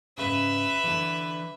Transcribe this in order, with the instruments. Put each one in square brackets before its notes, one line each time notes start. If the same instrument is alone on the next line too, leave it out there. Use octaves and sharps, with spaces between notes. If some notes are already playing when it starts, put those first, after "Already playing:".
[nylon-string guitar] G#2 C#3 [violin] B4 [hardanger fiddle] E5
[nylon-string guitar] D3 E3